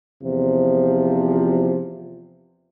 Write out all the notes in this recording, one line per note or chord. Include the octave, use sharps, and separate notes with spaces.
E2 C3 F3